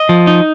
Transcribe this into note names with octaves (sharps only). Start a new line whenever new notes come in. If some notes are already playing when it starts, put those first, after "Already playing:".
Already playing: D#5
F3
D#4